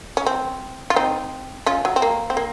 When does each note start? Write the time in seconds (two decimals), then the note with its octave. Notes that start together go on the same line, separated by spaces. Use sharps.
0.17 C#4
0.27 C4
0.90 F4
0.96 C4 D#4
1.66 C#4 F4
1.85 F#3
1.96 C4
2.02 A#3
2.30 C4
2.37 A#3